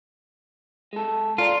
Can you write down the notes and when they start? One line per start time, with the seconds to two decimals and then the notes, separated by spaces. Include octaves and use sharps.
0.93 G#3 A4
1.38 F4 A4 D5 A#5